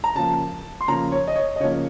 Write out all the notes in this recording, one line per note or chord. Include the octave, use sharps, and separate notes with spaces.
A#5
C#3 F3 A#3 A5
C6
C#3 F3 A#3 A#5
C#5
D#5
C#5
D#5
C#3 F3 A#3 C#5